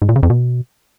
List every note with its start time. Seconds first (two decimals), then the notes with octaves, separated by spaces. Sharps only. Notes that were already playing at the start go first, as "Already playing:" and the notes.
0.02 G#2
0.09 A#2
0.16 C#3
0.23 F2
0.30 B2